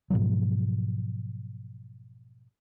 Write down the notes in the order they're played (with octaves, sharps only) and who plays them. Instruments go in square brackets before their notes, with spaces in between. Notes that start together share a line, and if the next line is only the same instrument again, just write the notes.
[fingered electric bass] G#2 B2 F3 F#3